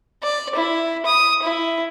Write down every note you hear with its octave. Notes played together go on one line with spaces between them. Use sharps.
D5
E4
D#6
E4